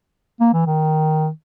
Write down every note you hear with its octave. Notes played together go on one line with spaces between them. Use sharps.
A#3
E3
D#3